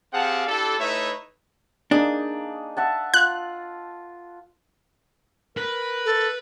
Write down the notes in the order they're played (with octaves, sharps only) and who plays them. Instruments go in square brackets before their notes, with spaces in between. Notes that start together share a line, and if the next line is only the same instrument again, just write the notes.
[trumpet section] C4 G4 G#4 F5 F#5 A5
D4 E4 G4 A4
A3 D#4 E4 B4 C#5 E5
[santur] A#3 D#4 G#4 [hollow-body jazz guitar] D4
[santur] E5 F#5 A5
[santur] F4 [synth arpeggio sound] F#6
[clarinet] A#4 [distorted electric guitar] B4
[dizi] A4